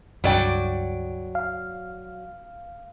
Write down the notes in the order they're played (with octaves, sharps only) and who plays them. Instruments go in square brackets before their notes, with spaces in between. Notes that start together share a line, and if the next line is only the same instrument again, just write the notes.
[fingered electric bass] C#2 G2 [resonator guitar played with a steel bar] F#3 D5 G5
[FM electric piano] F5